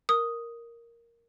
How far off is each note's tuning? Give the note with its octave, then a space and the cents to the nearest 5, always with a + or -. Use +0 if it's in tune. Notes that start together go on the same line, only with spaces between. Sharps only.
A#4 +0 D#6 +0